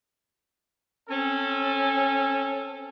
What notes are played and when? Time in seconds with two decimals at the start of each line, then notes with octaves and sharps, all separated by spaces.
1.09 C4 C#4 A4